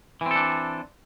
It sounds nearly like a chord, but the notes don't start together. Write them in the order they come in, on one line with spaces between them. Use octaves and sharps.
E3 C4 A4 D4